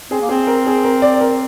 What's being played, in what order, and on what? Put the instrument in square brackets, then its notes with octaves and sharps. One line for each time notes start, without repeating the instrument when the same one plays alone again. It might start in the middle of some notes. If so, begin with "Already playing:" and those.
[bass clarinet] C4 [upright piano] G#4
[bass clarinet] A#3
[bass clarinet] C4 [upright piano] G#4
[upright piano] A#4
G#4
A#4
D5
A#4